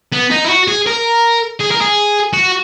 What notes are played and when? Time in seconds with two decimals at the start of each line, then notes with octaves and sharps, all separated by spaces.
0.13 B3
0.31 D#4
0.45 E4
0.49 F#4
0.68 G#4
0.86 A#4
1.60 G#4
1.71 A#4
1.81 G#4
2.33 F#4